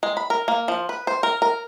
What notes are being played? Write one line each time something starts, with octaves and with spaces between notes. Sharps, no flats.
G#3
B5
A#4
A#3
F3
B4
C5
A#4
A#4